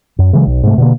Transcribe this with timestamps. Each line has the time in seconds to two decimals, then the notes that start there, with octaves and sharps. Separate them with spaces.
0.19 F#2
0.33 C#3 E3 F#3 G#3
0.46 B1
0.63 G#2 C3 A3
0.78 B2 D3 A#3